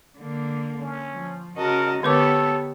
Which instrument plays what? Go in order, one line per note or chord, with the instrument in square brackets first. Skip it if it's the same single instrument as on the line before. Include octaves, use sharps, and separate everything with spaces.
[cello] D3 A#3
[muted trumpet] C#4
[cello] F3
[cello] C#3 F#4 [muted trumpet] A#4 [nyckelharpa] D#5 A5
[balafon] D3 B4 D6 [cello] B3 C#5 [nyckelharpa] G4 [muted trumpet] A4